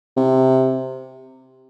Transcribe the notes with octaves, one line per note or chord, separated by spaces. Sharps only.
C3